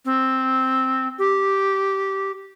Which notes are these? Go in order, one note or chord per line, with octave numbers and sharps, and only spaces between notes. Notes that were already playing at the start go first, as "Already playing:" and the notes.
C4
G4